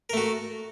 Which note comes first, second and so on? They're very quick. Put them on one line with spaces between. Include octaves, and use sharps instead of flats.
A#4 A3 F#4